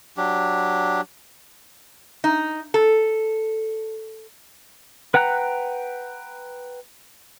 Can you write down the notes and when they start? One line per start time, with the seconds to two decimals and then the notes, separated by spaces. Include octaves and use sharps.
0.17 F#3 D4 G4
2.24 D#4
2.74 A4
5.14 B4 F#5 G5 A#5 F#6